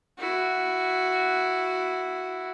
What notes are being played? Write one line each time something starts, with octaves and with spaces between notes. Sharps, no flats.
E4 F#4